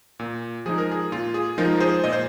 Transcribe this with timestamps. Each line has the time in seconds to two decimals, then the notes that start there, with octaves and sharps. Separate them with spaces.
0.19 A#2
0.66 F3 G#3 D#4 G#4
0.78 A#4
0.91 G#4
1.12 A#2 F4
1.34 G#4
1.58 F3 G#3 D#4 F4 A#4
1.80 G#4 C5
2.04 A#2 D#5
2.13 C5